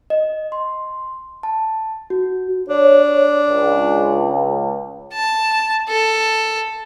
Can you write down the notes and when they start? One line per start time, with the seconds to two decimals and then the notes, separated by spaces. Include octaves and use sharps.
0.10 D#5
0.52 C6
1.43 A5
2.10 F#4
2.68 D4 C#5
3.48 C#2
5.13 A5
5.89 A4